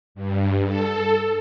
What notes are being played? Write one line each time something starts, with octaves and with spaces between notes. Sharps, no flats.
G2
A4